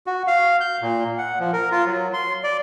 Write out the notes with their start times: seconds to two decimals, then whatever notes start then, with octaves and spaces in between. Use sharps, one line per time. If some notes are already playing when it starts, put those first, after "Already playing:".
0.07 F#4
0.27 F5
0.61 G6
0.82 A#2
1.18 F#5
1.40 F3
1.53 A#4
1.72 F4
1.86 F#3
2.13 C6
2.44 D5